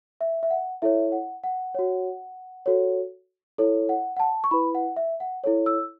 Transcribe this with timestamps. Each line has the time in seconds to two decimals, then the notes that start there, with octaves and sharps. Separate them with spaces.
0.21 E5
0.43 E5
0.50 F#5
0.82 E4 A4 C#5 E5
1.12 F#5
1.44 F#5
1.74 F#4 C#5
2.66 F#4 A4 C#5
3.58 E4 A4 C#5
3.89 F#5
4.17 F#5
4.20 A5
4.44 C#6
4.51 E4 B4 B5
4.75 F#5
4.96 E5
5.20 F#5
5.44 E4 A4 C#5
5.66 E6